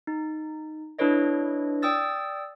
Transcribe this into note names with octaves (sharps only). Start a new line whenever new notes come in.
D#4
D4 E4 A4 B4 C#5 D#5
D5 G5 D#6 E6 A6